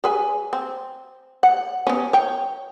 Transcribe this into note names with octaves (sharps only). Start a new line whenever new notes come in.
G#4 B4 G#5
C4
F#5
B3 C#4
C#5 G5